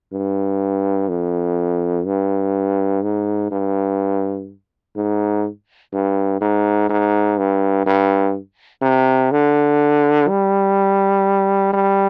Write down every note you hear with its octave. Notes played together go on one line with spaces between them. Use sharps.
G2
F2
G2
G#2
G2
G#2
G2
G#2
G#2
G2
G2
C3
D3
G3
G3